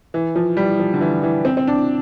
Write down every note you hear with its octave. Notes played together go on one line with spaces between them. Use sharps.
E3
F3
G3
F3
D3
E3
E3
C4
C4
D4